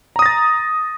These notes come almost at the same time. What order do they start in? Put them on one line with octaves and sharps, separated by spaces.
A#5 D#6 A#6 A6